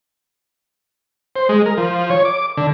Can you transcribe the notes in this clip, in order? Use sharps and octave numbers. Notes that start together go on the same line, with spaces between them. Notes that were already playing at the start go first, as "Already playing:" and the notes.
C5
G#3
A#4
F3
C#5
D6
D3